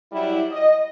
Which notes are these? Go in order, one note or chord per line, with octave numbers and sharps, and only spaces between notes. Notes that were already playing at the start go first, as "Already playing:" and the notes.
F#3 G3 E4
D#5